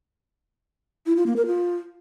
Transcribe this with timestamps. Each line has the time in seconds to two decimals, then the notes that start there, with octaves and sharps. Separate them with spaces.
1.06 E4
1.16 F4
1.26 A#3
1.36 A#4
1.46 F4